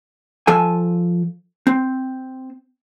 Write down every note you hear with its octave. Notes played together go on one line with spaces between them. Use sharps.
F3 A4 G#5
C4